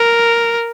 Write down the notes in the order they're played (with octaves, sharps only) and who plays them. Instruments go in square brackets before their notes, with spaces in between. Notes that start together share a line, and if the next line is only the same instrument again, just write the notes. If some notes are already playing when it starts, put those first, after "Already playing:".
Already playing: [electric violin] A#4